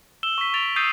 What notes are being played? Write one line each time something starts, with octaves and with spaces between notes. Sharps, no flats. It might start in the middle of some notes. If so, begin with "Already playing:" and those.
E6 E7 G7
C#6 B6
A6 D7 F7
D#6 E6 G6 A6 C7 D#7